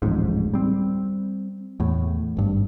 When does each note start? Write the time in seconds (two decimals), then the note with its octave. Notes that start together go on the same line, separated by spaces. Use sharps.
0.02 D1 A1 F2 G#2
0.54 G3 C4
1.80 E2 A2
2.37 G#1 G2